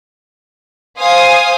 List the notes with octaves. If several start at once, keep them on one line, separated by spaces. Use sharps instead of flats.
C5 F5 G#5 D#6